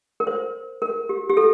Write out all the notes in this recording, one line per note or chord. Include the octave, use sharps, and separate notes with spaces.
A#4
C5
A#4
G4
G4
A4